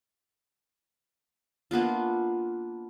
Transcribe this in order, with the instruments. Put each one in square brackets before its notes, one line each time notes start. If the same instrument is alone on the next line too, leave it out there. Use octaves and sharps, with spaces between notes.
[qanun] A#3 B3 D4 F4